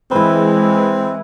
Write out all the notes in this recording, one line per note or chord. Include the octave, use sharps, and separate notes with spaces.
E3 G#3 C4 E4 B4